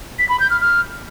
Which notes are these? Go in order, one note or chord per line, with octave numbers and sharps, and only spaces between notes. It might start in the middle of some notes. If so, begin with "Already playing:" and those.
B6
B5
G6
F6
F6